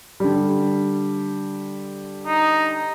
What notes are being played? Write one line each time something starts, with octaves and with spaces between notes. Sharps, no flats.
D3 G3
D#4